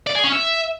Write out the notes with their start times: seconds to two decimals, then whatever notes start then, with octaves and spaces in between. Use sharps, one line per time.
0.07 D5
0.15 G#4
0.24 C#4
0.32 E5